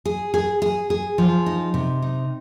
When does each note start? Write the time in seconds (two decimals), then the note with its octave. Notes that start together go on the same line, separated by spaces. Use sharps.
0.05 G#4
0.34 G#4
0.62 G#4
0.90 G#4
1.18 F3
1.46 D#4
1.74 C3
2.02 D#4